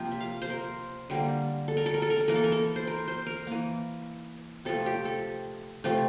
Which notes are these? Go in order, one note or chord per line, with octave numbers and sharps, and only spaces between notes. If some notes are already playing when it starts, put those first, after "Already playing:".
Already playing: C3 F3 A#3 G5
E5
F5
C5
A#4
D3 G3 A#3
A4
A#4
A4
A#4
A4
A#4
A4
E3 A#3 A#4
A4
A#4
A4
C5
A#4
C5
A#4
E3 A#3
C3 F3 A3 A4
G4
A4
C3 F3 A3